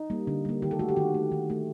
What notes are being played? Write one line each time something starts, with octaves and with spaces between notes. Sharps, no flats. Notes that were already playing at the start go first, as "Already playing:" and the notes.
Already playing: D#4
G3 A#3
D3
G3 A#3
D#3 G4
A4
A3 F#4
G4
D#3 F#4
A3
D#3
A3